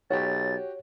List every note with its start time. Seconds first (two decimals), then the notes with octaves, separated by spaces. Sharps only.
0.10 B1 F#4 G4 C#5 A6